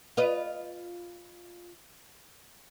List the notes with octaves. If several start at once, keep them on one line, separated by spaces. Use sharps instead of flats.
F4 B4 D#5